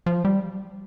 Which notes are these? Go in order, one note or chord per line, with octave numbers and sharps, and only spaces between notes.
F3
G3